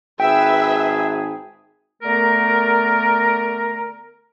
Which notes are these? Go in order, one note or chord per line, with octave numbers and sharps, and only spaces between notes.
G#1 G#4 B4 E5 G5
D3 A3 B3 A#4